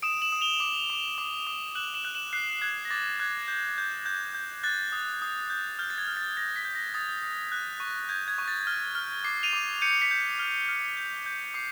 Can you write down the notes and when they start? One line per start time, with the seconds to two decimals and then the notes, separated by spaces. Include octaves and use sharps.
0.02 D#6 D7 E7
0.22 E7 F#7
0.32 D#6
0.41 F7 G7
0.60 D6
0.90 D6
1.18 D6
1.47 D6
1.75 F#6 E7 F#7
1.94 E7 F#7
2.05 F#6
2.15 E7 F#7
2.33 F#6 C7
2.62 F#6 G#6
2.85 A#6
2.90 D6 A6
3.20 F#6 G#6
3.48 G6
3.78 G6
4.06 G6
4.34 G6
4.63 F#6 A6
4.92 D#6
5.22 D#6
5.50 G6
5.79 F6 G6
5.90 A6
5.98 G#6
6.08 F6
6.17 A6
6.37 G6 A#6
6.56 B6
6.65 G6
6.75 A#6
6.94 D#6 A6
7.23 D#6
7.52 F#6
7.80 C#6
8.09 G6 G#6
8.28 G#6
8.38 C#6
8.48 A6
8.67 F6
8.95 F6
9.24 D6 C7
9.43 D#7 F7
9.53 D6
9.81 G6 C#7 D#7
10.01 B6 C#7
10.11 G6
10.39 F6
10.69 F6
10.97 G6
11.26 G6
11.54 D6 C7